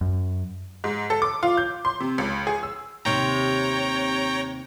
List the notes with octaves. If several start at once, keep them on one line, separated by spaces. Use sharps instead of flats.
F#2
G#2
A4
D6
F4
G6
C6
C3
C#2
G#4
E6
D#2 C3 C#5 G5 A#5